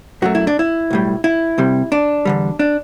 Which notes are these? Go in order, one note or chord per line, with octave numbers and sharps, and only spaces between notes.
F#2 F#3 A3 F#4
E4
D4
E4
B1 A2 G3
E4
C2 C3 G3
D4
E2 D3 G3
D4